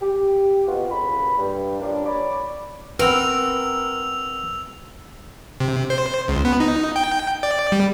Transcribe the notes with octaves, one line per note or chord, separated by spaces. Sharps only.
G4
F2 B2 F4 F#4
A2 C#3 A#3 B4 B5
G2
F3 G3 A#3 C#4 D4
C#5 D5 B5 D6
C4 F#4 A#4 B4 E6 F7
C3
C5
C#2
B3
D#4
G5
D5
G3